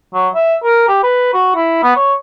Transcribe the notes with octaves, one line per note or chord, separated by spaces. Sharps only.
F#3
E5
A#4
G4
B4
F#4
E4
B3
C#5